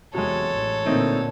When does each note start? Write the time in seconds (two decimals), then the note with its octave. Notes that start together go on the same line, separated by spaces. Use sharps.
0.14 E2 C3 F#3 G#3 A4 C#5
0.52 A1
0.85 A#2 D3 A3 C4 D#4